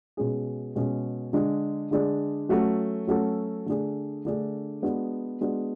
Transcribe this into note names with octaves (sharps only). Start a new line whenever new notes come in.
B2 G#3 C#4 G#4
B2 G#3 C#4 G#4
D3 G#3 D4 G#4
D3 G#3 D4 G#4
F#3 A3 C#4 F#4 A4
F#3 A3 C#4 F#4 A4
D3 A3 D4 G#4
D3 A3 D4 G#4
G#3 B3 D4 F#4
G#3 B3 D4 F#4